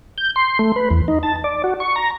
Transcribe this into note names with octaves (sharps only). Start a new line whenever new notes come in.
G6
C6
A3
B4
E2
D#4
A5
D5
F#4
C#6
A#5